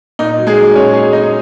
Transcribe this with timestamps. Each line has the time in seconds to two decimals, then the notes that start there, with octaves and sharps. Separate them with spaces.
0.19 A#2 D#4
0.38 F#3
0.47 G#3 G#4
0.57 F#3
0.75 A#2 C#4 C#5
0.94 A#2 G#4 G#5
1.13 F#3 D#4 D#5